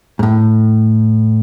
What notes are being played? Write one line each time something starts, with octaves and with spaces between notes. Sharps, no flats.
G#2
A2